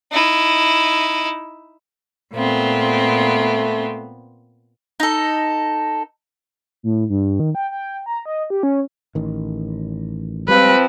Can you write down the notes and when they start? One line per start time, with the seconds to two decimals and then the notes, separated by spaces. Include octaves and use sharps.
0.12 D#4 E4
2.34 A#2 A3 B3 C4
5.00 D#4 A4
6.83 A2
7.09 G2
7.40 D#3
7.55 G5
7.71 G5
8.06 A#5
8.26 D#5
8.50 G4
8.63 C#4
9.15 A1 D#3
10.48 F3 G3 G#3 C4 B4